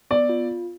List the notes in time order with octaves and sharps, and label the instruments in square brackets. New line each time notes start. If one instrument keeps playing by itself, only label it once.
[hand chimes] B3 [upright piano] D5
[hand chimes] F4